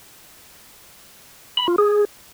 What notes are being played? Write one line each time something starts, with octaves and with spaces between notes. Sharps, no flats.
B5
F4
G#4